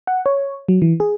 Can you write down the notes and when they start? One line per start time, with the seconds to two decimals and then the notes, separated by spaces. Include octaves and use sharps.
0.07 F#5
0.26 C#5
0.68 F#3
0.82 E3
1.00 G#4